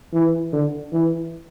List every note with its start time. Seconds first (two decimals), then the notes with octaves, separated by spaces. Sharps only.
0.14 E3
0.53 D3
0.93 E3